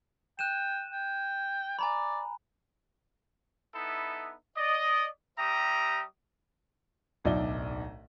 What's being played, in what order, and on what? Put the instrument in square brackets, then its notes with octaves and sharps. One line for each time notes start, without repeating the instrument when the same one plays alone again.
[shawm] G5 [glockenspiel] F#6 D#7 E7
[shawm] G5
[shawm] D5 [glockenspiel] G#5 A#5 B5
[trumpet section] B3 D#4 E4 A4 E5
D5 D#5
G3 G4 E5 A#5 D#6
[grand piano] D1 B1 D#4 D5 E5 G7